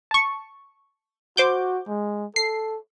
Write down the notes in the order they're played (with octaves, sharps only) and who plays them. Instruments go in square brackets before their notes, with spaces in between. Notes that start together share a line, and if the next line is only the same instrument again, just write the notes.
[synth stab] A5 C#6
[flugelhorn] F#4 [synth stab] C5 D6 G6
[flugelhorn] G#3
[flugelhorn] A4 [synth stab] C7